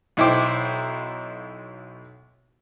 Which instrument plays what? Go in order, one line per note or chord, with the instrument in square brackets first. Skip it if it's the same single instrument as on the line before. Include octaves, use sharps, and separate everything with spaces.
[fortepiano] B1 D#4 E4 C5 G5 D6